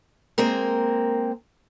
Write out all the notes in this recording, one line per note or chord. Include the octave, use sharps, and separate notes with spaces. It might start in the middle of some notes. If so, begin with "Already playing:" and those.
G#3 A#3 C4 A#4